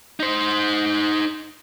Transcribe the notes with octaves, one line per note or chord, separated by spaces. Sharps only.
D#4 C5